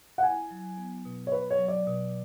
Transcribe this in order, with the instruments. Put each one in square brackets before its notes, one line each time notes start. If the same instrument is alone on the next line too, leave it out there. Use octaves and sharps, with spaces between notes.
[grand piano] F#5
[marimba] E4 [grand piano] G#5
[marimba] F#3
B3
B2
[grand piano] C#5
[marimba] B2 [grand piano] B4
[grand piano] C#5
[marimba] F#3
[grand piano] D5
[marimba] B2